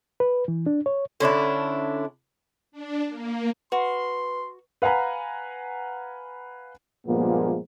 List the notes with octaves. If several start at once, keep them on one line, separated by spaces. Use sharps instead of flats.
B4
E3
D4
C#5
D3 C#4 D4 E4
D4
A#3
F#4 B4 C6
B4 F5 F#5 G#5 A#5 B5
G2 A#2 F3 G#3 A#3 B3